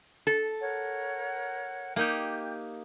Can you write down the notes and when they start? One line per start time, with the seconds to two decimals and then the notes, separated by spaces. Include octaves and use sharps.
0.27 A4
0.60 A#4 C#5 F#5
1.96 A#3 D#4 G4 G5 G6